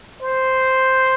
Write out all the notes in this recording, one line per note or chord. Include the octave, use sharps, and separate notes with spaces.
C5